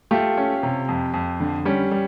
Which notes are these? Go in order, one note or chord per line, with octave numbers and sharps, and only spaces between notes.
A3 F4 G4
C#4
C3
F2
F2
D3
G3 C#4
G3